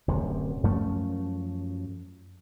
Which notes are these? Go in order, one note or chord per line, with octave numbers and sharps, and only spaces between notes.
D1 F#2 C3
F#2 F3 A3 C#4